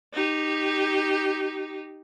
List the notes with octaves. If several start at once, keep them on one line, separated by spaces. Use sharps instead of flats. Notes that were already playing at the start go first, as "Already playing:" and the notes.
D#4 G4